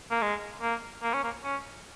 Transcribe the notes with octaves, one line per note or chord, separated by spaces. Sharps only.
A#3
G#3
A#3
A#3
C#4
A#3
C#4